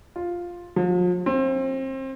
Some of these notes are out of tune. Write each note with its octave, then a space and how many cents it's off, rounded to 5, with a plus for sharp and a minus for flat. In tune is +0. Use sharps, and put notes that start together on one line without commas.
F4 +5
F3 +40
C4 +30